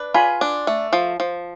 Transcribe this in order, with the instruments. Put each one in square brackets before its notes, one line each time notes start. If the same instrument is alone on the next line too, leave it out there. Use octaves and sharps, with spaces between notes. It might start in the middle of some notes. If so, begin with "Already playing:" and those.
Already playing: [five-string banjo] D4 B4
[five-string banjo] F4 [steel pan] G#5 B5
[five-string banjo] D4
A3
F3
F3